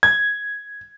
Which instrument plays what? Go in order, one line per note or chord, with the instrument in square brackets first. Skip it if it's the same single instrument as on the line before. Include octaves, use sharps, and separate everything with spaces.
[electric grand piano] G#6